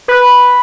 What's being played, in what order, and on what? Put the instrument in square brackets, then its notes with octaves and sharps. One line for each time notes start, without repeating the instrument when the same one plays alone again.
[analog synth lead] B4